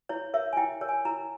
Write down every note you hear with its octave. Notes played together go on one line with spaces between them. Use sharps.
E4 C#5
A#4 C#5 E5
G#5
E4 G5
A#4 C#5
G#5
E4 A#5